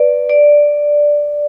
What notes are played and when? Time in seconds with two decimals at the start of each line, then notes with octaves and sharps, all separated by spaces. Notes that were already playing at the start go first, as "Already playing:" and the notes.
Already playing: B4 D5
0.29 D5